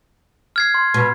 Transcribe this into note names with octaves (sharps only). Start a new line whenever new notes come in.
F6 G#6 C7
C6
B2